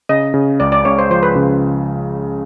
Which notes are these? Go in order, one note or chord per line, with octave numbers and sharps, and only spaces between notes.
C#3 D#5
C#3
C#2 D5
D5
C#2 C#5
C5
F3 C5
B4
C#3